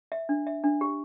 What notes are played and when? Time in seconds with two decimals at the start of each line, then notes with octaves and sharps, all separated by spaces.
0.12 E5
0.29 D4
0.47 E5
0.64 D4
0.81 G4